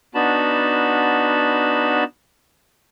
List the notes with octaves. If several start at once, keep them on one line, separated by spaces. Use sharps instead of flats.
B3 D4 D#4 F#4 A5 B5